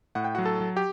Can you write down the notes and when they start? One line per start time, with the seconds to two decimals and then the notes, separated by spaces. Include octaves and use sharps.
0.15 A2 F#5
0.24 G5
0.35 F#4 F#5
0.38 F#3
0.45 A4 A5
0.61 F#3
0.76 G4 G5